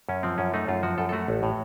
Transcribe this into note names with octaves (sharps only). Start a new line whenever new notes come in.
F#2 C#4
F3 C4
F#2 C#4
A3 D#4
F#2 F4
F3 F#4
F#2 A4
A4
A3 F#4
A1
A2